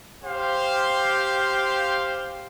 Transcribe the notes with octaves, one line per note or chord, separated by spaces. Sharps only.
G4 C5 F5 C6